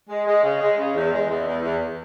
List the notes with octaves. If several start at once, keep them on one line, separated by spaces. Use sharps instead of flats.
G#3
G#3
C#3
G#3
C#3
E2
G#3
E2
E2
E2